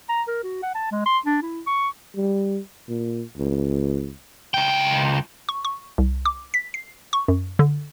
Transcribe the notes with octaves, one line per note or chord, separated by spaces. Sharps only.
A#5
A#4
F#4
F#5
A5
G#3
C6
D4
E4
C#6
G3
A#2
C#2
C#2 G5
C#6
C#6
C2
D6
B6
C7
C#6
F#2
D3